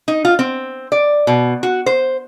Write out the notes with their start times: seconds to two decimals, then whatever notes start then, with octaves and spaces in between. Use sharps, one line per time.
0.08 D#4
0.25 F4
0.39 C4
0.92 D5
1.27 B2
1.63 F#4
1.86 C5